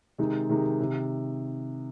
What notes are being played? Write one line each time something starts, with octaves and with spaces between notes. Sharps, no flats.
C3 D#3 G#3 D#4
C3 D#3 G#3 D#4
C3 D#3